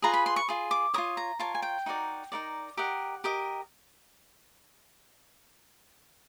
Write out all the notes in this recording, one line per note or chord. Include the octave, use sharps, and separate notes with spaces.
F4 G#4 B4 A#5
B5
C6
C#6
F4 G#4
D6
F4 A#4 C#5 D#6
A#5
F4 A#4 C#5 A5
G#5
G5
D#4 F#4 A#4 D5
D#4 F#4 A#4 D5
G4 A#4 D#5 F#5
G4 A#4 D#5